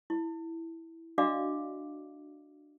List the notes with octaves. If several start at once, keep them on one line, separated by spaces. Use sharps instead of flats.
E4
D4 F#4 D5 D#5 F5 D6